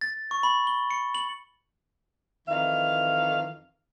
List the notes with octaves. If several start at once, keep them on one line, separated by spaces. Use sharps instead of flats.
A6
C#6
B5
G7
C#7
F#7
F2 D#3 E3 F5